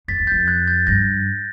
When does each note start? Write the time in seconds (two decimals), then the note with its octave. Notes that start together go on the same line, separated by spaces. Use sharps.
0.08 F2 A6 B6
0.20 E2
0.27 G6 A6
0.31 F2
0.48 F#6 G#6
0.67 G6 A6
0.87 G2 G#6 A#6